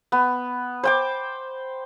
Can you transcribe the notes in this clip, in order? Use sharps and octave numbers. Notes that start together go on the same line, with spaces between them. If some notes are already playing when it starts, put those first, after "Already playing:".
B3
C5 G5 D6